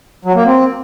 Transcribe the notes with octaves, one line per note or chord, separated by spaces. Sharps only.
F#3
A#3
C4